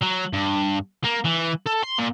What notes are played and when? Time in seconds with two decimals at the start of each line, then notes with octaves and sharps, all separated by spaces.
0.02 F#3
0.33 G2
1.05 A#3
1.25 E3
1.67 A4
1.84 C6
1.99 A#2